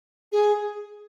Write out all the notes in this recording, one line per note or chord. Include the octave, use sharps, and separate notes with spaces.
G#4